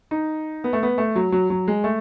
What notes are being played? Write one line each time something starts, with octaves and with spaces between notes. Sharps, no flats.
D#4
B3
A3
B3
A3
F#3
F#3
F#3
G#3
A3